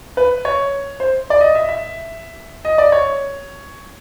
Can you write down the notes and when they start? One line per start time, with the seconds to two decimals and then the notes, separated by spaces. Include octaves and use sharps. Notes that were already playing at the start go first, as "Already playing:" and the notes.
0.17 B4
0.45 C#5
1.00 C5
1.30 D5
1.41 D#5
1.55 E5
1.69 E5
2.65 D#5
2.78 D5
2.92 C#5